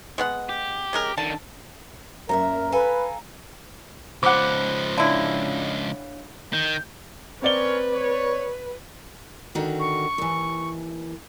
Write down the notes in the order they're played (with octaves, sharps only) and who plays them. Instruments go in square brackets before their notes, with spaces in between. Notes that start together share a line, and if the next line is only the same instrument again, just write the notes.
[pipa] G#3 B3 F#5
[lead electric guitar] G4
[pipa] C#3 G#3 A#4
[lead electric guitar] D3 D#3 [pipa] A5
[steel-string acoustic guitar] F#2 A#2 E5 [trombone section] A#4 [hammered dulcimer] A#5
[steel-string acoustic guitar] A4 F5 G#5 [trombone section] B4
[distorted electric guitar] C#2 F3 [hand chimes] C5 B5 [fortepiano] F#5 D6
[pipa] D3 E4 [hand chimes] D4 C#5 F5
[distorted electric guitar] D#3 [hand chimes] G6
[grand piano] C4 D5 G7 [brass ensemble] C#4 A#4 C#5 [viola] B4
[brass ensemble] C#5
[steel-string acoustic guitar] D3 D#3 F#4
[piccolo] C#6
[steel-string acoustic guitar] D#2 E3